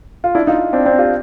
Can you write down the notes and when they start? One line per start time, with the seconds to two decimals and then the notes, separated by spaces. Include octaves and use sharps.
0.24 F4
0.35 D4 E4
0.47 D#4 F4
0.73 C4 D4
0.86 C4 D4
0.98 F4 G4